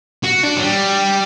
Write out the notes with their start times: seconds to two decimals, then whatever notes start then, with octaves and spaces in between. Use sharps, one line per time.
0.24 F#4
0.43 D4
0.57 F#3
0.62 G3